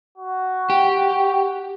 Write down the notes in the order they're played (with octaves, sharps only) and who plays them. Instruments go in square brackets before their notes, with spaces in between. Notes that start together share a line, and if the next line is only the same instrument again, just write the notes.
[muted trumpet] F#4
[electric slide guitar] G4